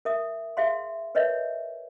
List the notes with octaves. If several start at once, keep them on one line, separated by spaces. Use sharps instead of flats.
A#4 E5 D#6
G#4 E5 F5 C6
A#4 B4 C#5 D#5 E5